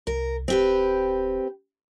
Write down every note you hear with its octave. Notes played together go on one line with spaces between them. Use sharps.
C2 A#4
D1 C4 G4 B4